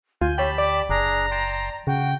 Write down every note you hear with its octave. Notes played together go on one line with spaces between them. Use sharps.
D2 F4 G#5 G6
G4 C#5 G5 A5 B5
D5 D6
F#1 D4 G#4 A#5
G5 A5 C6
C#3 F#4 G5